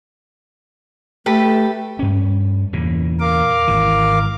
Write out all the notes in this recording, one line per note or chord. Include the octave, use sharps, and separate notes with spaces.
A3 G4 A4 B4
G2 C#4
E2 A#2 C#3
A#4 F5 D6
G#1 E3